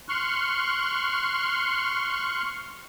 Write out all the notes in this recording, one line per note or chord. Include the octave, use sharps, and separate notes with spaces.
C6 C#6 F6 F#6